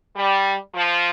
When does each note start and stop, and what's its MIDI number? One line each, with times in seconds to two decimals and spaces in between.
0.16 0.55 55
0.75 1.10 53